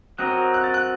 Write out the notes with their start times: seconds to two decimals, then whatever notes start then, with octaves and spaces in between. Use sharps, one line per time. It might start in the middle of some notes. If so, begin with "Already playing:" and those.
0.18 F#3 C4 F#4 A#4 D#5 F#6
0.54 F#6
0.64 A6
0.74 F#6